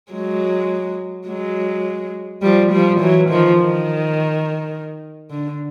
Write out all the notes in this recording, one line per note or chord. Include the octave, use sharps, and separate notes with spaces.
F#3 G#3
F#3 G#3
F3 G3
F3 G3
E3 F#3
D#3 F3
D#3
D3